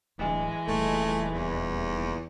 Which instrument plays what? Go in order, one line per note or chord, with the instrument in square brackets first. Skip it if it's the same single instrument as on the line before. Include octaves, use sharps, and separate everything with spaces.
[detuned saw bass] D1 [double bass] E3 [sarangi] G#3
[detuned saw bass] D#1 [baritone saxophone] A3
[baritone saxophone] E2